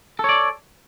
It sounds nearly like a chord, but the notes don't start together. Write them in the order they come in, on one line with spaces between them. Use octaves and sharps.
A4 C#5 D5